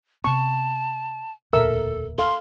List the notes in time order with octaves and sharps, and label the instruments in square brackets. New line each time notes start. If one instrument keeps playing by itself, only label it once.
[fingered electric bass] C3 B3 [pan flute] A5 [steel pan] C#6
[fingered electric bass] E1 D2 A#2 [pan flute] A4 [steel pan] A#4 E5 E6
[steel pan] A4 F5 [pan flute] C6